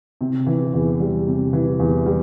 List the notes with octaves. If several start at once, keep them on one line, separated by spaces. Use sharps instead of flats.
C3
E3
E2
G3
C3
E3
E2
G3